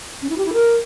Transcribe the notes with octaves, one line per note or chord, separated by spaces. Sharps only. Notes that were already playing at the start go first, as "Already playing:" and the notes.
C#4
E4
G4
E4
A#4